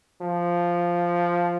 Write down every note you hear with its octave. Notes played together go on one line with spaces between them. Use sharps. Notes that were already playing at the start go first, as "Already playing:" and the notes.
F3